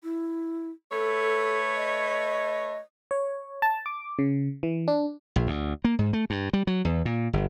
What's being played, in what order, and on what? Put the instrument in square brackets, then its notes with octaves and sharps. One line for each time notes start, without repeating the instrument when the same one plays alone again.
[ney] E4
[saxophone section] A3 B4 C#5 [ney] A4
[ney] D#5
[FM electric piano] C#5
A5
D6
C#3
E3
D4
[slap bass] A#1
D2
A#3
G#2
A3
G2
G3
F#3
E2
A#2
G1